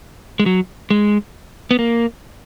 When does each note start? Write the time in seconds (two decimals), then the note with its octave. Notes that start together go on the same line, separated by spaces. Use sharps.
0.40 G#3
0.46 F#3
0.90 G#3
1.71 B3
1.79 A#3